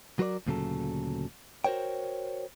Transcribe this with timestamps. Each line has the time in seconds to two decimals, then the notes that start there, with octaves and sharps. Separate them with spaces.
0.19 F#3 F#4 A#4 C5 D5
0.47 D2 A#2 C#3 F#3 A4
1.65 F#4 A#4 C5 C#5 G5